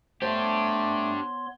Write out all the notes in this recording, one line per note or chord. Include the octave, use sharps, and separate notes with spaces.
A3 B3 D4 G4 C5 C#5 C6